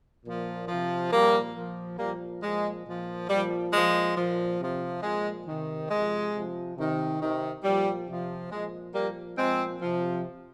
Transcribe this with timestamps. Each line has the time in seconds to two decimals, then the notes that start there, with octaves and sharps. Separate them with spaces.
0.24 A#2 F3
0.68 C3 F3
1.11 A#2 F3 G3 A#3
1.55 A#2 F3
1.98 A#2 F3 G3 A#3
2.42 A#2 F3 G#3
2.86 A#2 F3
3.29 A#2 F3 G3
3.72 A#2 F3 G#3
4.16 A#2 F3
4.60 C3 F3
5.03 A#2 F3 G#3
5.47 C3 D#3
5.90 C3 F3 G#3
6.33 C3 F3
6.77 C3 D#3
7.20 C3 D#3
7.63 A#2 F3 G3
8.07 C3 F3
8.51 A#2 F3 G#3
8.94 A#2 F3 G3 A#3
9.37 A#2 F3 G#3 C4
9.81 C3 F3